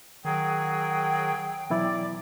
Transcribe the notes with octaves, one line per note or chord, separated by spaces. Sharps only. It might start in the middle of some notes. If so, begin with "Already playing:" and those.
D#3 F#3 G#4 G5
B2 E3 F#3 E4 D5